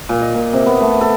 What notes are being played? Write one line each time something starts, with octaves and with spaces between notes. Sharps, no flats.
A#2
D#5
A#2
C3
B3
A3
A4